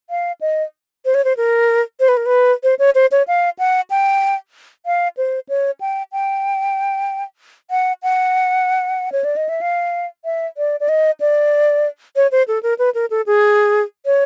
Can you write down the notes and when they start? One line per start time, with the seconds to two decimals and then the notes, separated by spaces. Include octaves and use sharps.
0.10 F5
0.41 D#5
1.05 C5
1.14 C#5
1.24 C5
1.37 A#4
2.00 C5
2.09 B4
2.17 A#4
2.26 B4
2.63 C5
2.79 C#5
2.95 C5
3.12 C#5
3.28 F5
3.59 F#5
3.90 G5
4.86 F5
5.17 C5
5.49 C#5
5.81 G5
6.12 G5
7.71 F#5
8.03 F#5
9.12 C#5
9.24 D5
9.36 D#5
9.49 E5
9.61 F5
10.25 E5
10.57 D5
10.80 D5
10.89 D#5
11.20 D5
12.16 C#5
12.32 C5
12.48 A4
12.63 A#4
12.79 B4
12.95 A#4
13.10 A4
13.26 G#4
14.06 C#5